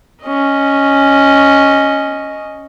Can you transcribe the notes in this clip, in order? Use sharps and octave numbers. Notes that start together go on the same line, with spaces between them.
C#4 D#5